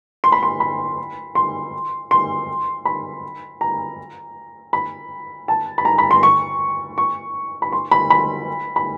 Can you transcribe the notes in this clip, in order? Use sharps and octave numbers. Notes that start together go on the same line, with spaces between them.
C6
B5
C6
B5
C6
C6
B5
A#5
B5
A5
B5
A#5
B5
C6
C#6
C#6
B5
C6
B5
B5
B5